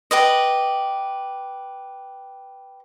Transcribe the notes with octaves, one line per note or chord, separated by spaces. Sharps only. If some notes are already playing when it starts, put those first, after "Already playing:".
G4 B4 D#5